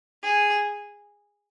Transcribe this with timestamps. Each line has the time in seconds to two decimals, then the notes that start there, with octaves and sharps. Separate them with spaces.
0.23 G#4